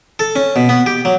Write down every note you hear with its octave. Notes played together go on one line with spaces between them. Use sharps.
A4
C#4
B2
B3
G4
F#3